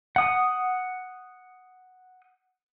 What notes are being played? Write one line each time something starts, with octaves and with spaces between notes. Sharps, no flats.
F#5 D#6